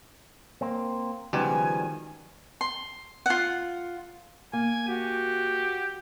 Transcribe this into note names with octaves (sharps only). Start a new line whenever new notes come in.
A#3 C4
C#2 B2 D#3 F3 G3 G4 G#5
C6
F4 F#5
A#3 G#5
F#4 G4